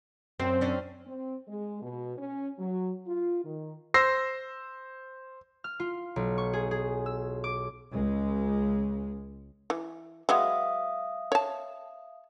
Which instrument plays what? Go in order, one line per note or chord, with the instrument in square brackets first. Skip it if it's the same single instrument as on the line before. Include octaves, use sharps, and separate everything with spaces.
[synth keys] F#2 C4 [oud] C5
[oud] C#4 D4
[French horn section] C4
G#3
B2
C#4
F#3
F4
D#3
[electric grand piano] C5 E6 A#6 C7
[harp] F6
F4
B1
C#6
G#4
G#4
E6
D6
[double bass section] C#2 G#3
[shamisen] E3
[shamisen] F#3 G#3 B3 [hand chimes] E5 F5 D#6
[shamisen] C#5 A5